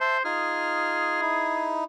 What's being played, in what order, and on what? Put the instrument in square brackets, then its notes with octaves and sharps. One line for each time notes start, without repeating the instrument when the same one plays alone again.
[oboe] C5 [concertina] E5 A5
[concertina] D#4 F4 F6 [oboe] G#4
[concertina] D#4 E4